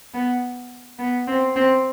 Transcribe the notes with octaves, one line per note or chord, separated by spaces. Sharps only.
B3
B3
C4
C4